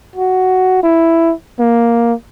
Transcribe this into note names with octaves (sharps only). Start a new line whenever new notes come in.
F#4
E4
A#3